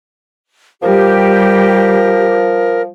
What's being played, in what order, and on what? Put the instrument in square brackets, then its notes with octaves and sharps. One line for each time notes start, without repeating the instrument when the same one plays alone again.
[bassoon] F3 [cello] G3 [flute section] G4 [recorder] A#4